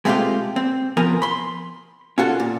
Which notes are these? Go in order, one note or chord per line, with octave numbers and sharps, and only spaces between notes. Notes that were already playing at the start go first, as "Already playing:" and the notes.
G#3 A3 C4 C#4 F4 G4
C4
F3 B3 A#4 G#5
B5 C6
C#4 F4 F#4 A4
A#2